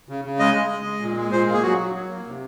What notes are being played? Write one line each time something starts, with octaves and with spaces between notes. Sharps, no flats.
C#3
C#3
G#3 D#5
G#3
G#3
G#3
A#2
G#3
A#2 C5
A#3
G#4
F#3 F#4
F#3
F#3
A#3
C3